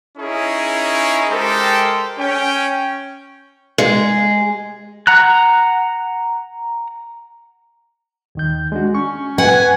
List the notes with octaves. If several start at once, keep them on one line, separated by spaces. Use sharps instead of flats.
C#4 D#4 E4 G#4 A#4 C#5
G#3 G4 A4 A#4 C5 G5
C#4 G5
G#3
F#5 A#5 F#6
D#2 D#3 G6
G#3 D4 F#4
C#4 C#6
B4 F#5 G#5